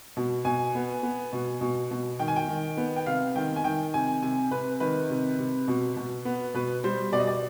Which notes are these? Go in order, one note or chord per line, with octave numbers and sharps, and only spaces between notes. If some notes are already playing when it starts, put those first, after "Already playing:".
B2
B2 G#5
B3
B3
B2
B2
B2
D#3 G5
G#5
G5
D#3
B3
G5
C3 F5
D#3 G5
G#5
D#3 G5
C3 G#5
C3 G#5
C3 B4
D#3 B4
C3
C3
B2
B2
B3
B2 B4
G3 C5
B2 D5
D#5
D5